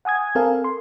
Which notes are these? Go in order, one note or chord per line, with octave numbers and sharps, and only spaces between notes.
F#5 G#5 D#6 G#6
C4 A4 A#4 F5 G#5
C6